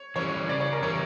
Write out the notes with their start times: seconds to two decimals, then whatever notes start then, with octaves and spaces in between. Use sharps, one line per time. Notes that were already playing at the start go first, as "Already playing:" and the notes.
Already playing: C#5
0.16 E3 G3 C#4 C#5
0.49 C#3 D5
0.60 C#5
0.72 A#4
0.83 E3 G3 C#4 C#5